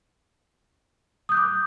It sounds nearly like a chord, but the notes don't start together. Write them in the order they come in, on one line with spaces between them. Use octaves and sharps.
D#6 G6 F#6 D6